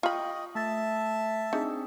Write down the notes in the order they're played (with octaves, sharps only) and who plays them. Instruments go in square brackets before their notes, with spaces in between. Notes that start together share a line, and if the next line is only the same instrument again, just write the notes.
[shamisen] F4 B5 [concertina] D#5 [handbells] G5 C#6
[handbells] A3 A6 [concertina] E5 A5
[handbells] C4 D4 G#4 [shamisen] D#4